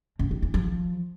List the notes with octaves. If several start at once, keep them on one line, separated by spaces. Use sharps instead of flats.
C#3
D#3
E3
F3